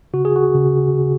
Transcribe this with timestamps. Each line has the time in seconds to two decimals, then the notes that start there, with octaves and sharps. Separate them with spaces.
0.14 C#3 F#4
0.25 G#4
0.36 F#4
0.55 C#3
0.95 C#3